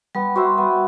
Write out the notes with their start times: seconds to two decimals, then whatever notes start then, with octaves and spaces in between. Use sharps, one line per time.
0.15 G3 B3
0.36 F#4 C5 E5
0.58 B3